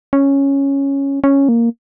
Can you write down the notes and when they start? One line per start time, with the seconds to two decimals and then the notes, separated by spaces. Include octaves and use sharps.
0.13 C#4
1.24 C#4
1.49 A#3